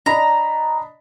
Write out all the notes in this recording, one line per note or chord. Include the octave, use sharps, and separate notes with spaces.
D4 D#5 A#5 B5